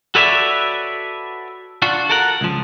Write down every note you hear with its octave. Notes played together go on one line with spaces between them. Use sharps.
F#4 A4 B4 C#5 D5 E5
D4 F4 F#4
A4 A#4 F#5
C#2 F3